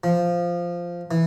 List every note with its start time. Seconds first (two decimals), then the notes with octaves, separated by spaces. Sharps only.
0.04 F3
1.11 E3